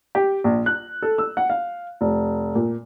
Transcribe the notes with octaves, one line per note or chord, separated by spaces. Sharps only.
G4
A#1
F#6
A4
E6
F#5
F5
F1
A#2